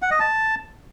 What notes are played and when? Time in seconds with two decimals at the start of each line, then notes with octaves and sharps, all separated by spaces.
0.02 F#5
0.11 D#5
0.20 A5